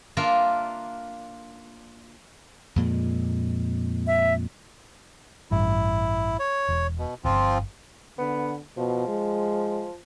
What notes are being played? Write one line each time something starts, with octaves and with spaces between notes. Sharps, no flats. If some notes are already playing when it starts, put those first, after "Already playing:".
A#3 D4 F4 A#4 E5
F2 A#2 G#3
E5
A1 G2 E4
C#5
E1
B2
D1 G1 F3 C4 F4
D3 B3
B2 F3
G#3